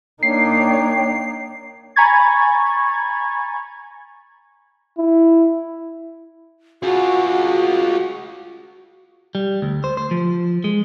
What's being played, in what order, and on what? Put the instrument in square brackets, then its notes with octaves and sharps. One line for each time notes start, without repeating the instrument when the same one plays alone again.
[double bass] A#3 D#4 [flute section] D4 C#5 G5 [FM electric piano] C7
[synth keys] G#5 A#5 B5 C#6 G#6 A6
[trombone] E4
[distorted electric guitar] F4 G#4 [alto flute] F#4
[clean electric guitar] G3
D2
C5
C5
F3
G#3